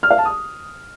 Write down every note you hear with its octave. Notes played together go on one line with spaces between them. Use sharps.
F6
F5
A5
D#6